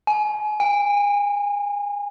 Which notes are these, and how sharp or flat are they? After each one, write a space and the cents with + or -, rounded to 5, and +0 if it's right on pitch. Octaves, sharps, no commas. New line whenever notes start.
G#5 +30
G#5 -35